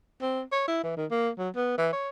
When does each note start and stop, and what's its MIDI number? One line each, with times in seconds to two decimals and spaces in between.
0.22 0.42 60
0.52 0.64 73
0.68 0.83 64
0.83 0.97 52
0.97 1.06 51
1.11 1.29 58
1.38 1.49 54
1.56 1.78 59
1.78 1.88 52
1.93 2.10 73